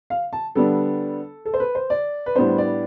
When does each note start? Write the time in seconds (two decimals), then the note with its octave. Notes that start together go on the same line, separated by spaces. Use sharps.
0.10 F5
0.33 A5
0.55 D3 G3 B3 D4 A4
1.45 A4
1.54 C5
1.60 B4
1.75 C5
1.90 D5
2.26 B4
2.35 A2 G3 B3 D4 C5
2.58 D5